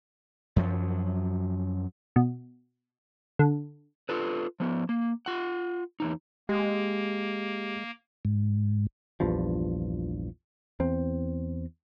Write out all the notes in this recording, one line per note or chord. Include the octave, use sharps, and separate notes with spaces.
F#2 F3 F#3
B2
D3
F4 A4 B4
F3 B3
A#3
F4 F#5
E2 C#3 D#4
G#3 A#3 G4
G#2
A#1 E2 G2 F3
E2 C4